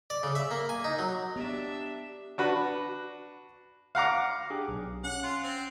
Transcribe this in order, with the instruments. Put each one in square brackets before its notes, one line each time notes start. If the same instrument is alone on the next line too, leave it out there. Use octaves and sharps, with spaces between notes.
[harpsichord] D5
C#3
E5
A#3
G#5
D#4
F#3
[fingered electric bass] B3 [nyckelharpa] D4 E5 [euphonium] G4
[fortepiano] D4 F#4 B4
F5 F#5 A#5 D6
[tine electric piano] D4 G4 G#4
B1
[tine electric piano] C#4 [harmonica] F#5
[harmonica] F4
C4